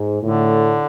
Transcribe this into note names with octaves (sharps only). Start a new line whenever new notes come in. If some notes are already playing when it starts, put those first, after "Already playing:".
Already playing: G#2
A2 D3